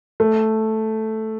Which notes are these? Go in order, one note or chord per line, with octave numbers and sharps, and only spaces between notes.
A3